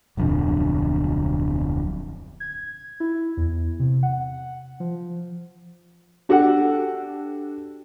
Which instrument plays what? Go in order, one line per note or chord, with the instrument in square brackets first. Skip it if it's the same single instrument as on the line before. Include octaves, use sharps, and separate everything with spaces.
[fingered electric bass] D1 B1 F2 D3
[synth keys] G#6
E4
E2
C3
F#5
F3
[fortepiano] D4 F#4 G4 A4 F#5